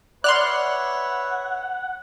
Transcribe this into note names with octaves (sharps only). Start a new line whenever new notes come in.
B4 C#5 D5 E5 F#5 C6 F6 F#6